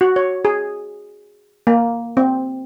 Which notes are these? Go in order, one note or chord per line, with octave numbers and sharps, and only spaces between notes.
F#4
C#5
G#4
A#3
C4